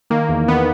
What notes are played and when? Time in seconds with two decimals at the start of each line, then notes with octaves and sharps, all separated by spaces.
0.10 D#3 A#3
0.29 E2
0.48 D#3 B3